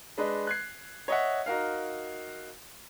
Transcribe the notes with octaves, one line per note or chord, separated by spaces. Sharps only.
G#3 D4 B4 D#5
F#6 G#6 C7
C#5 D#5 E5 F#5
D#4 F#4 A#4 F5